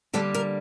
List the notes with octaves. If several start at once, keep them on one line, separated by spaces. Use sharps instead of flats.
D3 G3 A#3 A4
A#4